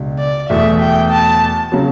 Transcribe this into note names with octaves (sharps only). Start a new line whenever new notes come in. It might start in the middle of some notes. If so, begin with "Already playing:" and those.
Already playing: C#2 B2 D4
D5
E2 B2 A3 E5
G5
A5
C#3 F#3